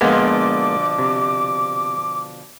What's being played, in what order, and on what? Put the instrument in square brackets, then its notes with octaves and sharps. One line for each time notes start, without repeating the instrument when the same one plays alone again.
[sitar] B2 D3 F3 [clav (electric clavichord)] G#3 A#3 B3 [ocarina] D6
[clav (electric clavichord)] C3